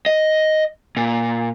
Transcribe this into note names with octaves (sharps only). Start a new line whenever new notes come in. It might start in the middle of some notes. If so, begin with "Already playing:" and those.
D#5
A#2